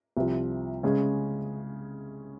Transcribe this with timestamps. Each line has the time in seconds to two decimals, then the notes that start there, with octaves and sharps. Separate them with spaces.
0.17 C2 C3 F3
0.83 C#3 G#3 C#4 G#4